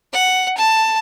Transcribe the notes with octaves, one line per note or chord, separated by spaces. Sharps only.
F#5
A5